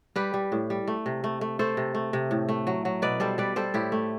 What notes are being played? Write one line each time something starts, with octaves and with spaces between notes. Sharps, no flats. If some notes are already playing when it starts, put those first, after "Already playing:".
G3 G4 B4
G3
A2
G3
A3
C3
A3
A3
A3 A4 C5
C3
A3
C3
A2
A3
F#3
F#3
B2 B4 D5
G3 A4 C5
G3 B4 D5
G3 A4 C5
A2 E4 G4
A3